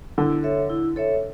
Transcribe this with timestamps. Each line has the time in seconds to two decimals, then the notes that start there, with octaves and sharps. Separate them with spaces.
0.18 D3 E4
0.43 A4 C#5 E5
0.70 E4
0.96 A4 C#5 E5